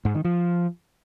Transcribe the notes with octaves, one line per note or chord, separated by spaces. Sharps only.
G#2
D#3
F3